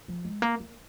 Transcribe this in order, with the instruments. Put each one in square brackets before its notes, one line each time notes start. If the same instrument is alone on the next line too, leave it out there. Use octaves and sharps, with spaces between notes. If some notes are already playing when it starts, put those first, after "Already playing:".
[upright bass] F3
G#3
A#3
A#3